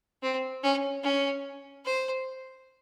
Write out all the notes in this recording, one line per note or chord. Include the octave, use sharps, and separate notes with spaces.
C4
C#4
C#4
C5